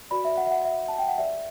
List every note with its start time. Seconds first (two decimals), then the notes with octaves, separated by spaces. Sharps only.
0.11 F#4 B4 D5 B5
0.25 E5
0.37 F#5
0.46 E5
0.51 F#5
0.65 E5
0.88 A5
0.98 G5
1.08 F#5
1.18 G4 B4 D5 E5